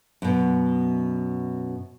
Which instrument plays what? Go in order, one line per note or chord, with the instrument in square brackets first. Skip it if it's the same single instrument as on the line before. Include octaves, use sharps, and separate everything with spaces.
[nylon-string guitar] F#2 B2